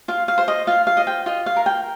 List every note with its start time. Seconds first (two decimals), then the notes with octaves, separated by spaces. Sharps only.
0.08 F4 F5
0.28 F5
0.38 C5
0.48 D#5
0.67 F4 F5
0.87 F5
0.97 D#5
1.07 G5
1.26 F4 D#5
1.46 F5
1.56 A#4
1.66 G5